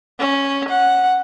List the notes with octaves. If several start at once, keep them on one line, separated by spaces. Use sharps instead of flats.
C#4
F#5